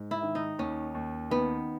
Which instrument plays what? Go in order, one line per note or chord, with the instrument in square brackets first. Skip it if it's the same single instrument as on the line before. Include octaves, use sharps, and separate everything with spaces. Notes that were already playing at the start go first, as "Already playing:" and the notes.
Already playing: [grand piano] G#2
[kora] E4
[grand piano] D#3
[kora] D#4
[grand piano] D#2 [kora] C#4
[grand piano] D#2
[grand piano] D#3 [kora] B3